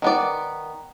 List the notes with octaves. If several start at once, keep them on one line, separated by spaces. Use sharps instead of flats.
D#3 B3 D5